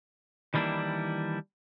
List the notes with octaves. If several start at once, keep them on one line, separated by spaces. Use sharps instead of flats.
D#3 E3 G3 A#3 D4 E4